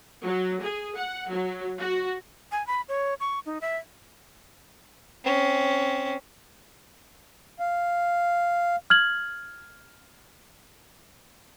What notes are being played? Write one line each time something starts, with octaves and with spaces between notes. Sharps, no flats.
F#3
G#4
F#5
F#3
F#4
G#5
B5
C#5
C#6
D#4
E5
C4 C#4
F5
F6 G#6 F#7